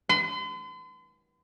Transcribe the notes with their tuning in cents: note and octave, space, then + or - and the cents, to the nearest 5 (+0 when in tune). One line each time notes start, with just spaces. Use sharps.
C6 -45